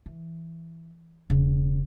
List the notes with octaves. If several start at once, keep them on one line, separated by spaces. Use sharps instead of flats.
E3
E1 C#3